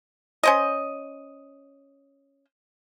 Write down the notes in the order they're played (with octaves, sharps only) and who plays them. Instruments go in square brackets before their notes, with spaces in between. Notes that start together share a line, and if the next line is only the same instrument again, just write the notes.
[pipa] C#4 C5 D#5